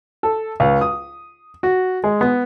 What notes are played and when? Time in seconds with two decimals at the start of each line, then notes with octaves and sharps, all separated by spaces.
0.23 A4
0.60 C#2
0.81 D#6
1.63 F#4
2.04 G#3
2.21 B3